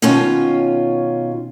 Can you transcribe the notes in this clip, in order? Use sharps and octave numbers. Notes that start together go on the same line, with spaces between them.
B2 D#3 C#4 F4 C#5